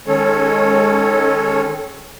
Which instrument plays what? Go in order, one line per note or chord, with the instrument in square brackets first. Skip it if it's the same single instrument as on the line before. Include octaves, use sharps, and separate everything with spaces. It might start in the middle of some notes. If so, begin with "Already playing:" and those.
[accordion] D#3 G#3 C#4 A4 C#5